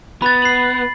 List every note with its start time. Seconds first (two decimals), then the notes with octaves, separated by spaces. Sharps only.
0.22 B3 B5 A6
0.42 C7 F#7